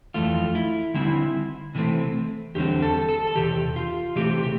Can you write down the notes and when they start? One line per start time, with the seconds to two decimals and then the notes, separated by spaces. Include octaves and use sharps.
0.14 F2 E3 A3 F4
0.55 E4
0.94 D3 G3 C4 E4
1.75 C3 E3 A3 C4
2.55 E2 D3 G3 C4 G4
2.82 A4
3.09 A4
3.27 A4
3.36 E2 C3 G4
3.76 F4
4.16 C3 E3 A3 C4 G4
4.43 G4